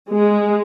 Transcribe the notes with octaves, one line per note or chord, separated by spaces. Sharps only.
G#3